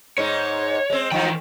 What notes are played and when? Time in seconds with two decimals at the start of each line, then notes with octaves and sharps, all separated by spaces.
0.18 G#2 G#3 D#4 C#5
0.90 G#3 C4
1.12 E3 F3 D#4 G5